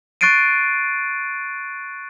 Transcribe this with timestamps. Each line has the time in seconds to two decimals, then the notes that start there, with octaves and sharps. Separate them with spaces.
0.21 C#6 F#6 A6 C7 D7 D#7